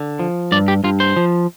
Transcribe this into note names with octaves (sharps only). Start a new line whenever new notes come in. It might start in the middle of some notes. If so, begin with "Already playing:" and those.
Already playing: D3
F3
G2 D5
G4
G2 F4
C5
F3